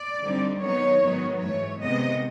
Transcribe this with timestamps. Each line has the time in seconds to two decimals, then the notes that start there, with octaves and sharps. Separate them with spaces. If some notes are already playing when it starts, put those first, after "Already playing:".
Already playing: D5
0.22 D3 G3 C4 D#4
0.62 D#3 F#3 B3 D#4 C#5
1.01 G#2 D#3 F#3 B3 D#4
1.41 G#2 E3 A3 C#5
1.81 C3 D#3 G#3 B3 D#5